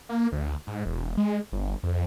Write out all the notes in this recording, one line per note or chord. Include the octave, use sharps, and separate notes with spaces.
A#3
D2
G#2
E1
G#3
G1
F2